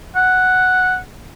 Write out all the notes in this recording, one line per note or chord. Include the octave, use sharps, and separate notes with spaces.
F#5